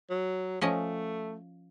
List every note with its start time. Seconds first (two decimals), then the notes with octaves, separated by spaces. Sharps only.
0.10 F#3
0.61 F3 A3 C#4 D#5